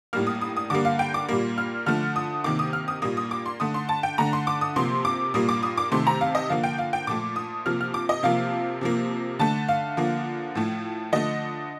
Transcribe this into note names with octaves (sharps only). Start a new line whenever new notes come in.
A2 G3 A#3 F6
D#6
D#6
D#6
D3 G3 A#3 D6
F5
G5
D6
A#2 G3 A#3
F6
D3 F3 A3 F6
D#6
C3 D#3 A#3 D6
D#6
F6
D#6
A#2 G3 A#3 D#6
D#6
D6
C6
D3 A3 D#6
C6
A5
G5
D3 A3 A#5
C6
D6
D#6
C3 F3 A#3 C6
D6
A#2 G3 A#3 D#6
D6
D#6
D6
C3 D#3 A3 C6
A#5
F5
D#5
D3 F3 A#3 F5
G5
F5
G5
A#2 F3 A3 D6
D#6
C3 F3 A#3 F6
F6
D6
D#5
C3 F3 A#3 F5
C3 F3 A#3
D3 A3 A5
F5
D3 F3 A#3
A2 F3 A3
D3 F3 A3 D#5